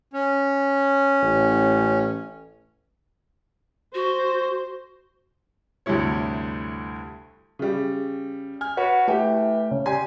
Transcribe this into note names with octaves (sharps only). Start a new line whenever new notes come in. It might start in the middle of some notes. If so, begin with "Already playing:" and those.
C#4
A1
F#4 C5
D2 G2 C3 E4 C#5
C#3 G3
G#5 F6
F#4 B4 C#5
E3 A3 G4
C#3
G3 G#5 C6